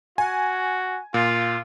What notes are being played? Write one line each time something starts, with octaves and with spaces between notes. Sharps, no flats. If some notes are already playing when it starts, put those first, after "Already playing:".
F#4 G#5
A#2 F4